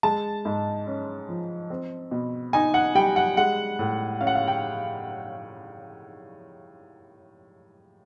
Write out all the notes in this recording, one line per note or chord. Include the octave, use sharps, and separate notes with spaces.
G#3 A5
G#2
C#4
F3
C4
B2
D#4 G#5
F#5
G3 G5
F#5
G#3 F#5
A2
C#4 F5
F#5
F5
G5